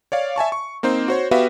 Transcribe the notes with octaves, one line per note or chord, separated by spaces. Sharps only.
C#5 D5 F5
E5 G#5 A5 C#6
C#6
A#3 C4 D#4 C5
F#4 C5 C#5
B3 F#4 G4 B4 E5 F5